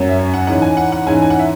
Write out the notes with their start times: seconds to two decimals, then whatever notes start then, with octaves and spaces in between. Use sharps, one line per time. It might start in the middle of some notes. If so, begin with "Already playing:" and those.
Already playing: F#2 F#3 C#4
0.09 E5
0.19 C#5
0.34 F#5
0.47 G#2 E3 C#4 F#5
0.62 G#5
0.77 F#5
0.92 F#5
1.06 G#2 E3 C#4 G#5
1.22 G#5
1.30 F#5
1.39 E5